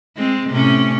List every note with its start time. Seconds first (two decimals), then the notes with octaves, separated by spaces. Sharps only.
0.17 G#3 C4
0.49 A2 C3 C#4